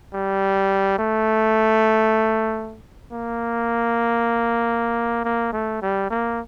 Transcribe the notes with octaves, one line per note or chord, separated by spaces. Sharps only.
G3
A3
A#3
A#3
A3
G3
A#3